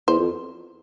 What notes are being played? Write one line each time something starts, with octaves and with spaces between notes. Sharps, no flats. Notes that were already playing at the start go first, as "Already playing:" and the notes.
E2 C5
F2